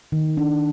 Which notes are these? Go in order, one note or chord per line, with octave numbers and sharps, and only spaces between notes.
D#3
D4